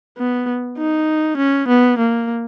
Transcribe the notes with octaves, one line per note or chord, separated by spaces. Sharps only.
B3
D#4
C#4
B3
A#3